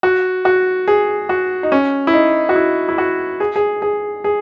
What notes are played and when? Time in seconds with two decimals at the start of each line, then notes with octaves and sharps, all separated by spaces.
0.03 F#4
0.45 F#4
0.88 G#4
1.29 F#4
1.63 D#4
1.72 C#4
2.07 E4
2.14 D#4
2.49 F#4
2.56 E4
2.89 E4
2.98 F#4
3.40 G#4
3.56 G#4
3.82 G#4
4.24 G#4